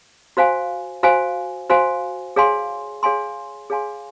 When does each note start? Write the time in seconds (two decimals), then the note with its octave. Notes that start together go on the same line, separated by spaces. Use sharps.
0.37 F#4 C5 F5 G#5
1.03 F#4 C5 F5 G#5
1.70 F#4 C5 F5 G#5
2.36 G#4 C#5 F5 G#5 C6
3.03 G#4 C#5 F5 G#5 C6
3.70 G#4 C#5 F5 G#5 C6